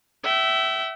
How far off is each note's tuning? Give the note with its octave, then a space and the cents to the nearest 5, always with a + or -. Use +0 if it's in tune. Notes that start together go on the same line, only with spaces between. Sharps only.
E5 +0 G5 -40